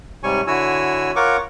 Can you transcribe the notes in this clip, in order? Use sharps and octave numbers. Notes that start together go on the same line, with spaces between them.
G#2 C3 G3 C#5 G#5 C#6
D3 E4 F#4 C#5 G#5 E6
F4 A#4 C#5 F#5 C#6 D6